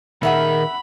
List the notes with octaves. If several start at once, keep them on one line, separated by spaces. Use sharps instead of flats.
A#2 D#3 A#3 G#4 E5 F#5 B5